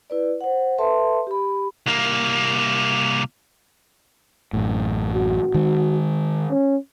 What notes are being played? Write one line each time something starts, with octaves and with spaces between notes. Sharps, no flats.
E4 B4 D5
C5 F#5
A4 B4 E5 A5 C6
G4 B5
C2 A#3
A1 F#2 A2
F#4
D#3 G#3
C#4